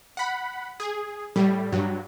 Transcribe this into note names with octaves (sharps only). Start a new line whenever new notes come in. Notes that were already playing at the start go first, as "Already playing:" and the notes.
F#5 B5
G#4
A2 G3
G2 F#3